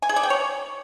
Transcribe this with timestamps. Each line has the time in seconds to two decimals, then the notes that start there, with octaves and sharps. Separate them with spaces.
0.02 G#5
0.09 G#4
0.16 D5
0.23 G5
0.30 C#5